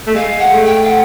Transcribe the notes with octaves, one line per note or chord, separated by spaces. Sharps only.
A3
G#3 F5
F#5
A3
G5
F5
F#5